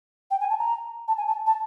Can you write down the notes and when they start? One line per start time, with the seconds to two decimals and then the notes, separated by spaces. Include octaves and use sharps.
0.31 G5
0.40 G#5
0.50 A5
0.59 A#5
1.08 A5
1.18 G#5
1.27 A5
1.47 A5